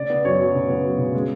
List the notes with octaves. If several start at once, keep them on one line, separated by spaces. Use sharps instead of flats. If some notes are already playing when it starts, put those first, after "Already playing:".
Already playing: C#3 D5
B3
F#2 C#5
F#3
C#3
B3
F#3
C#3
G#3